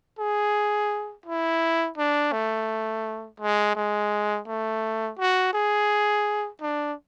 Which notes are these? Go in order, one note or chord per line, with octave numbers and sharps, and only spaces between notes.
G#4
E4
D4
A3
G#3
G#3
A3
F#4
G#4
D4